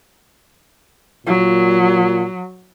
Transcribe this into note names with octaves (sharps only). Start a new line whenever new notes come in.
A#2 F#3 F4